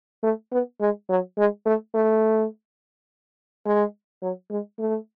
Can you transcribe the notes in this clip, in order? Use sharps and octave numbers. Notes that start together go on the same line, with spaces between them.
A3
B3
G#3
F#3
G#3
A3
A3
G#3
F#3
G#3
A3